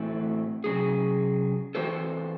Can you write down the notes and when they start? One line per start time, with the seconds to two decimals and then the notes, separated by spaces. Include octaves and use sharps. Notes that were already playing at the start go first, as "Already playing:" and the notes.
Already playing: A2 E3 A3 C4 F#4
0.64 C3 F#3 C#4 G#4
1.75 E3 C4 F#4 A4 C5